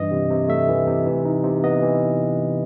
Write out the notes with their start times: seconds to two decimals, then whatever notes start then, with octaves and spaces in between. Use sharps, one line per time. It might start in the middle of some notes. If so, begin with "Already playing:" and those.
Already playing: G2 E3 D#5
0.11 C3
0.30 C3
0.48 A3 E5
0.69 E3
0.87 C3
1.07 E3
1.25 D#4
1.44 C3
1.64 B3 D#5
1.82 E3